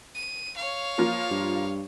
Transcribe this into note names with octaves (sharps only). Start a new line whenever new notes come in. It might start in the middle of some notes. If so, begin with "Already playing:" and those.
D#7
C#5 F5
F3 A#3 F4
G2